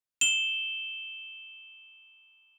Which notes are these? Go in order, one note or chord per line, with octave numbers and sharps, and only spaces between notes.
E7 G7